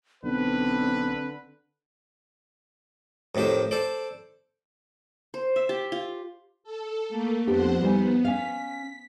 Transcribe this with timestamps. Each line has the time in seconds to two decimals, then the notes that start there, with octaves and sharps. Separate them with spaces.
0.24 B1 D3 C4 B4
3.35 F2 A2 D#3 G4 C5
3.71 A4 C5 D5
5.34 C5
5.56 E5
5.69 G4
5.92 F4
6.64 A4
7.09 A3 A#3
7.47 F2 B3 D4 G4 C5 F#5
7.81 G3 B3 D#4 G#5
8.25 C#4 F5 B6